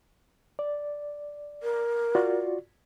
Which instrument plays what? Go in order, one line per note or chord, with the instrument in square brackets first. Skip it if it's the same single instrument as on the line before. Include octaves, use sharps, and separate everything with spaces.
[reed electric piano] D5
[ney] A#4
[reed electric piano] F4 F#4 D5